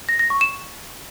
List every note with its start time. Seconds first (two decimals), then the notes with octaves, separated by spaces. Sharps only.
0.09 A#6
0.19 A#6
0.30 C#6
0.41 E7